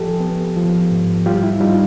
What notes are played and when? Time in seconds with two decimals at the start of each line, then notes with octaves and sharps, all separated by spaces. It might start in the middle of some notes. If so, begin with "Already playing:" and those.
Already playing: F3 G4 A4
0.20 B3
0.56 F3
0.91 G#2
1.26 G3 F4 G4
1.43 E4
1.60 G3 D#4 F4